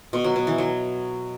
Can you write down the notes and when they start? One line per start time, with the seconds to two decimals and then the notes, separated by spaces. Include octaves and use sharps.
0.13 B2
0.24 F#3
0.36 B2
0.47 E3
0.58 F#3